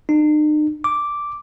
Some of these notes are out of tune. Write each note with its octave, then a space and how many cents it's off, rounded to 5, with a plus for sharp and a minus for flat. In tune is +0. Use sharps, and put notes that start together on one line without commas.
D#4 -45
D6 -5